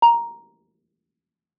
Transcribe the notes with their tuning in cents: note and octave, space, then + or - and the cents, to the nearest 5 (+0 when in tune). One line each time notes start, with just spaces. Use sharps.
A#5 +5